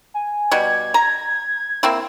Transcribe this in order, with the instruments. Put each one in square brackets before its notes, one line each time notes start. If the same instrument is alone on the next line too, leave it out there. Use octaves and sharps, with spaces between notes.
[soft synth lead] G#5
[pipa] B2 G3 [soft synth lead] G#6
[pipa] A#5
A#3 C4 E4